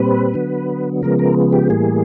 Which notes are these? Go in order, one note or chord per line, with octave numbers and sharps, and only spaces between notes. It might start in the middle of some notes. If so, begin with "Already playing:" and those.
Already playing: A#2 G3 C4 B4
D3 F#3 B3
C#3 F3 G#3 B3 A#4
A#4
G4
A2 E3 G3 A#3 G#4